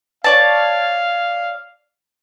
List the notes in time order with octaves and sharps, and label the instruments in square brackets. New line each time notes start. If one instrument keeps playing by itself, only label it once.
[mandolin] C#5 D5 A5 [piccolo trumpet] F5